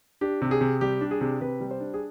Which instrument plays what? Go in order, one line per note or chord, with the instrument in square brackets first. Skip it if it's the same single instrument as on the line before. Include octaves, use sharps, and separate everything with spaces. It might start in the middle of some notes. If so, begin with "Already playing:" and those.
[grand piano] D4 G4
C3
G#4
C3
G3 G4
D4
G#4
C3
C3 B4
G3
C5
D4
G#4